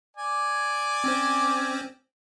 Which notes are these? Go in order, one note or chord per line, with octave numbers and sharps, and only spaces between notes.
D5 G#5
C4 C#4 C5